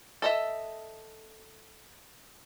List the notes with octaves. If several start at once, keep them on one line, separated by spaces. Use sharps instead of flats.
A4 D#5 E5